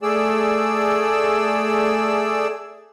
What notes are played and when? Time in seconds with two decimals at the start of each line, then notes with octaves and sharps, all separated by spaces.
0.03 A3 G#4 D5 E6